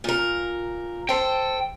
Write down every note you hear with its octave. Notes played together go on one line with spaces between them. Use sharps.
A#2 A#4
A4 C5 G5